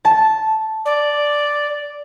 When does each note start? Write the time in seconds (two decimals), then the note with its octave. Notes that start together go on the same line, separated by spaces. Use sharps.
0.05 A5
0.86 D5